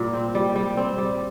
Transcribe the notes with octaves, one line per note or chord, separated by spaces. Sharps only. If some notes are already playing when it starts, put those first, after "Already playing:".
Already playing: A#2 G3
C4
G3
G3
C4
G3